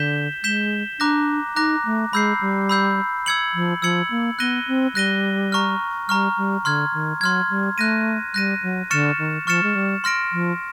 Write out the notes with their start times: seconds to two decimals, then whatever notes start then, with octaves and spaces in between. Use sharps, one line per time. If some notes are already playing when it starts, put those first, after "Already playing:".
Already playing: D3 G6 B6 E7 G7
0.43 G#3 G6 B6 E7 G7
1.00 D4 A#5 D6 F#6 A#6
1.56 D#4 A#5 D6 F#6 A#6
1.85 A3
2.13 G#3 B5 E6 G6 C7
2.41 G3
2.69 B5 E6 G6 C7
3.26 E6 G#6 C#7 F#7
3.54 F3
3.82 F3 E6 G#6 C#7 F#7
4.10 A#3
4.39 B3 F#6 A#6 D#7 G7
4.68 C4
4.95 G3 F#6 A#6 D#7 G7
5.52 A#5 C#6 F6
6.08 G3 A#5 C#6 F6
6.37 G3
6.65 D3 C6 F6 G#6
6.93 D#3
7.21 F#3 C6 F6 G#6
7.50 G3
7.78 A3 F#6 A#6 D#7
8.34 G3 F#6 A#6 D#7
8.62 F#3
8.90 D3 C#6 F6 A6 C#7 E7
9.19 D#3
9.47 F3 C#6 F6 A6 C#7 E7
9.63 G#3
9.75 G3
10.04 C6 F6 A#6 D7
10.32 F3